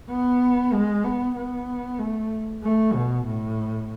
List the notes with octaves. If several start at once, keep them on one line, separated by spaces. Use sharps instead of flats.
B3
G#3
B3
B3
A3
A3
B2
A2